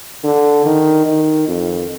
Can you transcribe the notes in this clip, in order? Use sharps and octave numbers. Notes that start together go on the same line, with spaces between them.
D3
D#3
D#3
F2